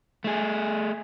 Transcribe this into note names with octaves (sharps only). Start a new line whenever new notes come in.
A3 G#4